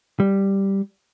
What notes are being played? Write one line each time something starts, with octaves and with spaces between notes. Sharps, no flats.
G3